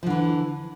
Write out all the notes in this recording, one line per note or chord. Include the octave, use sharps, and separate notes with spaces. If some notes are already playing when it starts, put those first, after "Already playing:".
D3 E3 F3